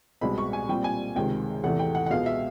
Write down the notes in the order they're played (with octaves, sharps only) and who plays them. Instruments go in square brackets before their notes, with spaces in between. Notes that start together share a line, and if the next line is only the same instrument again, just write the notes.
[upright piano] C2 B2 G#3 C4 B5
C#6
G#5
A#2 G3 C4 G5
G#5
C#2 C3 D#3 G#3 G5
E2 C3 E3 A3 F#5
G5
F#5
F#5
C#2 B2 G#3 B3 F5
E5